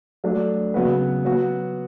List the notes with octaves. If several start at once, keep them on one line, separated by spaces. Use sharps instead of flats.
F#3 A3 D4
C#3 F#3 B3 F#4 B4
F#3 B3 F#4